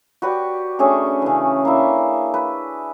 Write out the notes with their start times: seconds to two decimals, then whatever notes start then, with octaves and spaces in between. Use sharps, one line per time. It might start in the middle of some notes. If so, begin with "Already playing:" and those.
0.22 F#4 G4 B4 D5
0.79 A3 C#4 D4 G#4
1.22 C#3 E3
1.65 A#3 D4 E4
2.34 B4